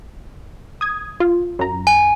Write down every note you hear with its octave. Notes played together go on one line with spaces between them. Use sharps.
D#6 G#6
F4
F#2 A#5
G#5